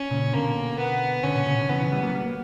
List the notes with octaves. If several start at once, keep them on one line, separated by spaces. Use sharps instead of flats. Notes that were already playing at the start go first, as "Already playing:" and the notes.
Already playing: C#4
A#2 C#3
B2 D3 A#3
B3
B2 D3 C#4
A#2 C#3
A#2 C#3
B2 D3
C#3 E3 B3
C#3 E3
E3 G3
F#3 A#3
G3
A#3